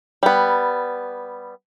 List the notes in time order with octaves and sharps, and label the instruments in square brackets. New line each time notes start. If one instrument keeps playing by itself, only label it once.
[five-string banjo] G3 B3